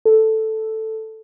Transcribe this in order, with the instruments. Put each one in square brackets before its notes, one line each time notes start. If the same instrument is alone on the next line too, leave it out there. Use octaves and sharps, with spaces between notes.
[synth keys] A4